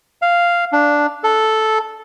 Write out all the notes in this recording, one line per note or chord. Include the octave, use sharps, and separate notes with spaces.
F5
D4
A4